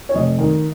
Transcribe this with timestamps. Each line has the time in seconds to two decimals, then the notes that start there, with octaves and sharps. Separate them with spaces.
0.09 C#5
0.15 F1 D#5
0.39 D#3